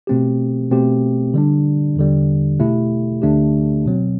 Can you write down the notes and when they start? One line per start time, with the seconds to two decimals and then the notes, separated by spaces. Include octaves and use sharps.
0.07 B2 A3 C4 G4
0.71 B2 A3 C4 G4
1.34 D3 G3 D4
1.96 E2 D3 G3
2.59 B2 A3 E4 G4
3.22 D2 D3 A3 D4 G4
3.85 B2 F#3 C4